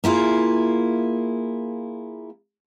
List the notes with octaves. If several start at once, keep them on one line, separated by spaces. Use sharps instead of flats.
A#3 E4 F4 G#4